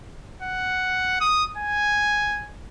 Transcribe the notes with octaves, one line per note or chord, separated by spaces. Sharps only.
F#5
D#6
G#5